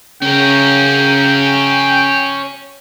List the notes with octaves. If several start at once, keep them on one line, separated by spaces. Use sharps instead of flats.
C#3 C#4 A#4 G5